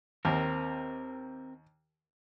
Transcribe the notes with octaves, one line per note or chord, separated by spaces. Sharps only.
D#2 C4 A#4